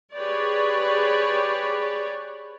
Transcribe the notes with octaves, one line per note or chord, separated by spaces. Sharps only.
G4 G#4 B4 C#5 D5